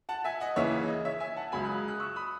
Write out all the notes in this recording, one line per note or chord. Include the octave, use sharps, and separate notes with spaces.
F#5 A5
E5 G#5
D#5 F#5
D#2 C#3 E3 C#5 E5
D#5
C#5 E5
E5 G#5
F#5 A5
C#2 C#3 F#3 G#5 B5
D#6 F#6
D#6 F#6
C#6 E6
B5 D#6